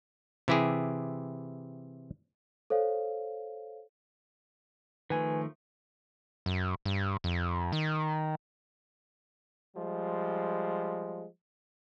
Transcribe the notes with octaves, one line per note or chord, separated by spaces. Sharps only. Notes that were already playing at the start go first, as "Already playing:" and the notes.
C3 E3 E4 G4 G#4
A4 C5 C#5 F5
D#3 F3 A3 B4 G#5
F#2
G2
F2
D#3
F3 G3 G#3